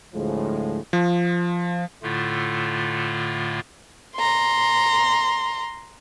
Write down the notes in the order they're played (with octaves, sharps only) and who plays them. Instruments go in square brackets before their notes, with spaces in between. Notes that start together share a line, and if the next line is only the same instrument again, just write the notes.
[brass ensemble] D2 A2 F3 G#3
[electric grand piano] F3
[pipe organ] A2 D3 A3 F4
[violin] A#5 C6